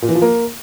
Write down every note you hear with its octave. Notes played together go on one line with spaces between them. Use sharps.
A#2
E3
F3
A#3